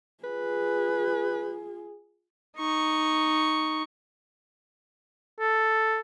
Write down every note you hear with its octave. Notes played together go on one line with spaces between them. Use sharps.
F4 G#4 B4
D#4 C#6
A4